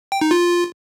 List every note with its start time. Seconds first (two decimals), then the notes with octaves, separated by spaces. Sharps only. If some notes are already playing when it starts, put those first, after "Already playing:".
0.12 G5
0.21 D#4
0.31 F4